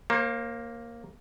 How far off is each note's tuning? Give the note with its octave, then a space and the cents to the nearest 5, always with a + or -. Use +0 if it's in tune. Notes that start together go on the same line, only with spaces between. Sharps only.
A#3 +0 C5 +40